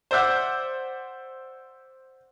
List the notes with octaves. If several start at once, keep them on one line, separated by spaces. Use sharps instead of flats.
C5 D5 E5 F#5